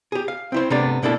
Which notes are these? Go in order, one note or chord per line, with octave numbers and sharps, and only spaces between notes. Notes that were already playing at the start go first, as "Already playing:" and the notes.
G4 G#4
F5
C4 E4 C5
C3 A3 B3 D4 D5
B2 A#3 D4 E4 A4